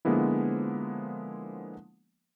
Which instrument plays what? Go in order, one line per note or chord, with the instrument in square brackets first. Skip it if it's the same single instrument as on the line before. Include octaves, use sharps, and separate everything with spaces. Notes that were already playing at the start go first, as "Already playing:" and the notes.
[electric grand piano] D3 F3 G#3 A#3 B3 E4